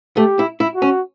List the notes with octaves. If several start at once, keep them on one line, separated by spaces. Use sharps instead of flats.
A3 G4
E4
E4
F#4
C#4